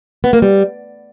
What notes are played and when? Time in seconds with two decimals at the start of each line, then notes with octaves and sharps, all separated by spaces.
0.24 B3
0.33 A#3
0.42 G3